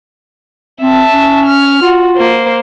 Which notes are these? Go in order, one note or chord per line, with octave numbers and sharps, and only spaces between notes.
C4 E5 A5
C#4
F6
F4 F#4
A#3 C5